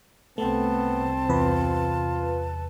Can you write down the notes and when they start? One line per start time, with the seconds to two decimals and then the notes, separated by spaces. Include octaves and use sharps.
0.38 C2 A3 B3 C4 A5
1.29 E2 C3 F4 B4